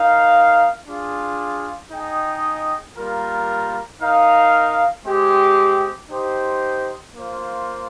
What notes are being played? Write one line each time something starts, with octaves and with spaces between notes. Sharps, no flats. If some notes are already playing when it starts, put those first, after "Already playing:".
Already playing: D#4 A#4 F5
D4 F4 G#4
D#4 G#4 D#5 G5
G3 A#3 F4 A#4
D#4 A#4 F5
G#3 C4 G4
D#4 G4 C5
A#3 F4 C5